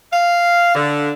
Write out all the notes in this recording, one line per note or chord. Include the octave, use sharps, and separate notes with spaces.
F5
D3